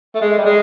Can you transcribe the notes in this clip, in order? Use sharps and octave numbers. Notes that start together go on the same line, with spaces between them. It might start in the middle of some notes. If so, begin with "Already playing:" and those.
A3
G#3
G3
G#3